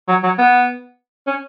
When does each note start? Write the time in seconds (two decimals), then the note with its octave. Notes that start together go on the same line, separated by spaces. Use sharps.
0.08 F#3
0.23 F#3
0.38 B3
1.27 C#4